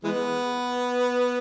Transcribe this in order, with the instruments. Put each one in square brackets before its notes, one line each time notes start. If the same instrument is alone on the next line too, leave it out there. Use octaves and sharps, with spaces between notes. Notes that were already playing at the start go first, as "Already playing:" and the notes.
[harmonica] E3 G#3 B3